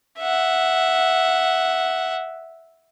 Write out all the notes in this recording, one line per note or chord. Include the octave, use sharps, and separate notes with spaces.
E5 F#5